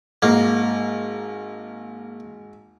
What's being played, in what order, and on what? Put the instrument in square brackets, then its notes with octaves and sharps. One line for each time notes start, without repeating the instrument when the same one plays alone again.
[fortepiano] G#1 [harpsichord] A#3